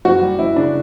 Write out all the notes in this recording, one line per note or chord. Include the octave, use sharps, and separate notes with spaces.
F#1 F#4
G3
F#1 E4
C#3 D4